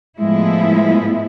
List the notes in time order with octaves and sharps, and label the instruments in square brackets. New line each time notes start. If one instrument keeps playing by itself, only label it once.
[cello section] A2 F3 G#3 B3 E4